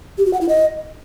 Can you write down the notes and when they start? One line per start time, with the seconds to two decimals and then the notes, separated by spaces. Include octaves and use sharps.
0.18 G4
0.26 F#4
0.33 F#5
0.41 E4
0.49 D#5